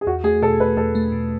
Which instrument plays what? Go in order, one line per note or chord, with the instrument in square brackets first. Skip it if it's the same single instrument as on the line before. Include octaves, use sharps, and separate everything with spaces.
[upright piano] G#4
[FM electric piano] E2 [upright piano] F#4
[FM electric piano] A3 [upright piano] G#4
[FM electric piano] B2 [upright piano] A4
[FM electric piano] E2 [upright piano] B4
[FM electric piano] E2 [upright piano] A4
[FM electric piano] A3
B2